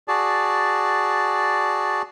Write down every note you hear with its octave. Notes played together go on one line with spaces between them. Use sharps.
F#4 G#4 D5 A5